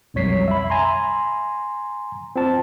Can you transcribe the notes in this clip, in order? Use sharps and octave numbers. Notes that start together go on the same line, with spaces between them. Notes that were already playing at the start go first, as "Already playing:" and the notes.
B1 F2 G3 C#5 B6 C7
E5 B5
G#5 A#5 C6
C4 F4 C5 A5